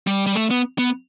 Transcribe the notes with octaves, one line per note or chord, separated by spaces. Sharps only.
G3
G3
A3
B3
B3